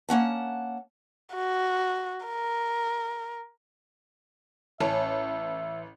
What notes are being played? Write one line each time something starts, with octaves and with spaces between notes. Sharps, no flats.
A#3 C#4 F#5 A5
F#4
A#4
A1 C#4 E5 A5